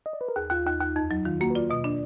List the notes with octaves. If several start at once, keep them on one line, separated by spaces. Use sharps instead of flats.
D#5
D5
B4
A#4
D#2 G#4
D#2 F4
D#2 D#4
D#2
F2 D#4
F#3 D#4
D#3 F4
A#3 F#4
B4
F4 D5
B2 D#5
D4 D5